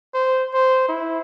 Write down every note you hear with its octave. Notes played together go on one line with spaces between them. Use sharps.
C5
C5
E4